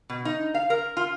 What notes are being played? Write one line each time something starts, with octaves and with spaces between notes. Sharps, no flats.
B2
D#4
F5
A#4
F4